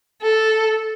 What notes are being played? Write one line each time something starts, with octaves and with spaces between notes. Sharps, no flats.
A4